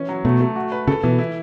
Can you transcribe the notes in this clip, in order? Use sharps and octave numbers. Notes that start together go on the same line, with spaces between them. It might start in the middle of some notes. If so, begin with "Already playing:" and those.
Already playing: E3 C#4
F#3
B2 A3
A3
F#4
B4
C#3 A4
B2 E3
E4